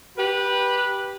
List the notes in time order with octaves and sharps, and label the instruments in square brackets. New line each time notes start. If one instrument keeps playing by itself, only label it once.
[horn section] G4 B4